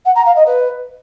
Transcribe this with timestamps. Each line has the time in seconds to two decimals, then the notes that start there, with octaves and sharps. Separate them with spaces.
0.05 F#5
0.15 A#5
0.25 F5
0.36 D#5
0.46 B4